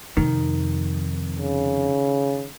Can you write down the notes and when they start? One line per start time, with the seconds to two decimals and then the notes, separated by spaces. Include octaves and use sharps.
0.17 F2 C3 D#3
1.38 C#3